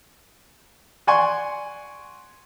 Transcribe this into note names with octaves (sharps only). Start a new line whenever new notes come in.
D5 F#5 G#5 C6 C#6